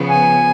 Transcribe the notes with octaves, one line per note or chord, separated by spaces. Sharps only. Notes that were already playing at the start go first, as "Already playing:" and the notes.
Already playing: C#3 F3 B3
G#5